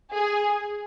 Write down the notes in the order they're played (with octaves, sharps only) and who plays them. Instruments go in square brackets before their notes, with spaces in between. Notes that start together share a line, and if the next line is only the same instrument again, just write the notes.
[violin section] G#4